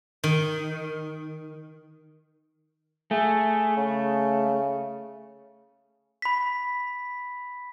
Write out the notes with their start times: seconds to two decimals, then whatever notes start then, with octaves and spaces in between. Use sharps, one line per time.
0.24 D#3
3.11 A3 G#4
3.77 C#3
6.22 B5 B6